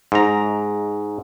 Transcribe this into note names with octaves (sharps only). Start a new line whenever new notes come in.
G#2 A#5